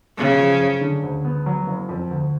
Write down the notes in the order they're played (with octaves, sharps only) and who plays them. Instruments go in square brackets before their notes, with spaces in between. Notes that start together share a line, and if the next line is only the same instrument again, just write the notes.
[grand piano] F#2 [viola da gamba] C#3
[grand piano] F3
F#2
D3
D2
B3
F#3
F#1
F2
D2